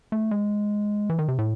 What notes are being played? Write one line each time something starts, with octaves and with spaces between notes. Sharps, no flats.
A3
G#3
E3
D#3
C3
A2